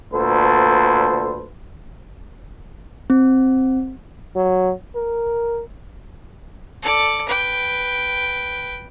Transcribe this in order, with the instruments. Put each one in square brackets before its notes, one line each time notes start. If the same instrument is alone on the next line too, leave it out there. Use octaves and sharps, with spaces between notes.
[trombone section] D2 A#2 A4 B4 C5
[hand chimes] C4
[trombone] F#3
A#4
[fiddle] A4 D5
B4 G5